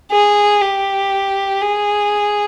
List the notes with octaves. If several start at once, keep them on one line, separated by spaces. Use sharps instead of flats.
G#4
G4
G#4